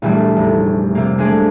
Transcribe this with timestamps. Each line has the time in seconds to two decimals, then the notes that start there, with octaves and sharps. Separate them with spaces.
0.02 A#1 E3 G3 A3
0.36 F1
0.95 C3 A#3
1.18 G#3 A3 D4 G#4 D5